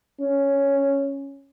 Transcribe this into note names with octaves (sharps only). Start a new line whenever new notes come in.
C#4